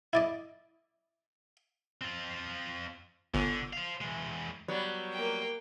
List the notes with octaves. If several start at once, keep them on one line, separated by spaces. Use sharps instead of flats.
E4 D5 D#5
C4 F4
G1 D3
C5 F5
E3 G#3
F#3 G3 B3
A#3 G5